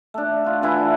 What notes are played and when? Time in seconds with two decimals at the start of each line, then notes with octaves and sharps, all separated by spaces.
0.14 A3 D4
0.44 F4 F#4
0.62 D3 E3 E4 B4